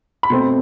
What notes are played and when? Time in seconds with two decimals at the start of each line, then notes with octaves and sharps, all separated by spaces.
0.23 B5
0.30 B2 A3 C4 C6